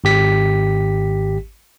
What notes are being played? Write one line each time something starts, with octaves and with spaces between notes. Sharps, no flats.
G#1 G4 B6